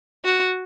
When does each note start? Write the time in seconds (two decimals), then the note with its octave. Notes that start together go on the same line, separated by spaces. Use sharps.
0.25 F#4